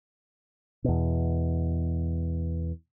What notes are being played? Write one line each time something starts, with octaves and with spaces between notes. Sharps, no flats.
E2 B2